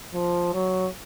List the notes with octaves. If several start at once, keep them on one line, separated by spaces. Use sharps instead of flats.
F3
F#3